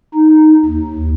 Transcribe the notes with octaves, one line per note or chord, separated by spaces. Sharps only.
D#4
D#2